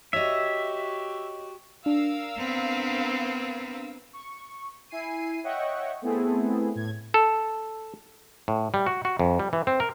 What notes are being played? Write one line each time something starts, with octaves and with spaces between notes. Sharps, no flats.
F#4 G4 C#5 D#5 E5
D4 A#4 F5 E6
B3 C4
C#6
E4 G#5 C7 D#7
C#5 D#5 E5 F#5 G5 C#6
A3 B3 C4 E4 G#4 A4
A2 G#6
A4
A2
G3
F#4
F#4
F2
G3
E3
C4
A#4